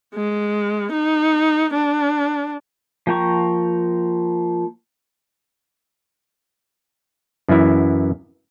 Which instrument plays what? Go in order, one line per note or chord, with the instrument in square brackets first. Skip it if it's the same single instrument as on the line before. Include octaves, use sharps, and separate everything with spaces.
[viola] G#3
D#4
D4
[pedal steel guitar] F3 A#3 G5 A#5 C#6
[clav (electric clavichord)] F#2 E3 E4